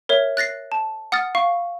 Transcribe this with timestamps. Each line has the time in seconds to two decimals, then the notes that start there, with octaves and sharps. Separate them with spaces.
0.09 A#4 C#5 E5
0.37 F#6 A6 A#6 C7
0.72 A5
1.12 F#5 D#6 F6 A6
1.35 F5 C#6